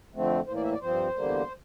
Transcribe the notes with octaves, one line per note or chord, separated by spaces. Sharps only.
F2 D3 A3 C4
A2 E3 A#3 C5
D5
E5
D5
G2 F3 C4 C5
E2 D3 G3 A#3